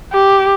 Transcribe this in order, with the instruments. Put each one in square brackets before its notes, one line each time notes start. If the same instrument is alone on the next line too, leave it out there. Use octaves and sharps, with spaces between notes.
[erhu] G4